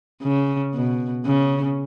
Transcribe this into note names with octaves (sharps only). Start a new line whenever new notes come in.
C#3
B2
C#3